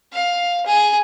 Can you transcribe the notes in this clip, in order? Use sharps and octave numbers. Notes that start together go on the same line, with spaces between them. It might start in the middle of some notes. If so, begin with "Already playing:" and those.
F5
G#4